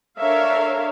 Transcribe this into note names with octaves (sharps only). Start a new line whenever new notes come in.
D4 A4 A#4 C#5 E5 F5